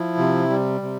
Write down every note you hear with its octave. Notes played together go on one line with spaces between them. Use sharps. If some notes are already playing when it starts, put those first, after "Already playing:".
Already playing: F3 E4
C3
G3
C3